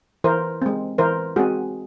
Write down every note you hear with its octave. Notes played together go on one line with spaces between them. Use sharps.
E3 A#4 C5
G#3 C4
E3 A#4 C5
G#3 C4 F#4 G#4